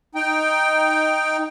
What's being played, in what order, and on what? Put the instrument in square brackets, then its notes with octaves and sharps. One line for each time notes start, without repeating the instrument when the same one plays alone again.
[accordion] D#4 G5